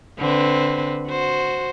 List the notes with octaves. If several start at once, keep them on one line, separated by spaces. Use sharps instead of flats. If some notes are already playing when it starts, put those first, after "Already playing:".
D3 C4 B4
F#4 C5